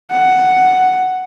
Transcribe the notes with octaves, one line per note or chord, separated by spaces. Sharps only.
F#5